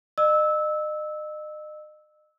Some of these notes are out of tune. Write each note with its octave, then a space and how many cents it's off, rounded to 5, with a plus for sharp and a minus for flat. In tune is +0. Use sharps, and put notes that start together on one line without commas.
D#5 -35 E6 -20